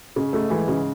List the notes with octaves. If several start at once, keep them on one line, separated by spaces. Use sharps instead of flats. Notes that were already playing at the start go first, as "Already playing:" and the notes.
G#2 C#3 G#3
G#2 G#3 A3
G#2 E3 G#3
G#2 C#3 G#3